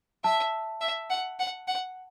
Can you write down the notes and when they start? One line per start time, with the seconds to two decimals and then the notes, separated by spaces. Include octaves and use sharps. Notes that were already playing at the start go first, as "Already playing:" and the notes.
0.24 E5 A5
0.81 E5
1.10 F#5
1.39 F#5
1.68 F#5